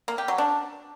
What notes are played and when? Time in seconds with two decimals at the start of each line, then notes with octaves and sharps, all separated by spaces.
0.08 A#3
0.18 G4
0.28 F#3
0.38 D4